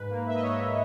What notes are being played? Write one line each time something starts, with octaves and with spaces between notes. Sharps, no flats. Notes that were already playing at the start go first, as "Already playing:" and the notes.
Already playing: G#2 B4
A#3
E5
D#5
G#2 C#5